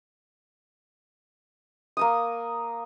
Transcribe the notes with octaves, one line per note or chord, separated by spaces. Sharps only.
A#3 A#5 D#6